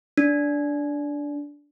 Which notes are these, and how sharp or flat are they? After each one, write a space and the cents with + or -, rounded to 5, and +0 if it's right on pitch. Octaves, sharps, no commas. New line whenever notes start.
D4 -10